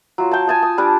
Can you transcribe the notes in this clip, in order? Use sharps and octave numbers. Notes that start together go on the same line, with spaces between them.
F#3 F4
G5 A5
G#5 A5 D#6
D#6
G3 D4